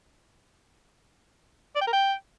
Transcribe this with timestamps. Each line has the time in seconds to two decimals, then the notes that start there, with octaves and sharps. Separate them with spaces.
1.75 D5
1.81 G5
1.87 A#4
1.93 G5